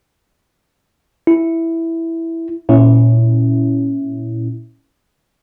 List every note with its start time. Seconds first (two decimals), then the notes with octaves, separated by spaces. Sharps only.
1.27 E4
2.69 A#2 C#4 E4